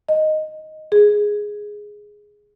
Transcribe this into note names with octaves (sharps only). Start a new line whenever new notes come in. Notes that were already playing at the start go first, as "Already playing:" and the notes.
D#5
G#4